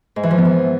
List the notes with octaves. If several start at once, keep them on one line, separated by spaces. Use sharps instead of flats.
G#2
E3
F3
B3
E3